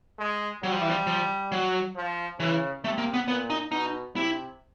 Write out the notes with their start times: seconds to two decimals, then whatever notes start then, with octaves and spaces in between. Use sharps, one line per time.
0.19 G#3
0.63 F#3 G3
0.72 F3
0.81 E3
0.89 F3
1.07 F3
1.52 F#3
1.96 F3
2.39 C#3 E3
2.84 C3 A3
2.98 A#3
3.14 B3
3.28 A#2 B3
3.50 D#4
3.72 B2 D#4
4.16 C3 E4